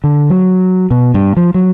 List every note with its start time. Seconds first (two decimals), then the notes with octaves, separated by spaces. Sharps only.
0.04 D3
0.30 F#3
0.91 B2
1.14 G2
1.37 F3
1.54 F#3